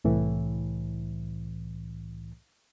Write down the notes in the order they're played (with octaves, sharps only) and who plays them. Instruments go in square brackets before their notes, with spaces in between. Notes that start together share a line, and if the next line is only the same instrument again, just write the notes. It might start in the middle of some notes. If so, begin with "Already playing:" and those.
[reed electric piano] C2 A2 E3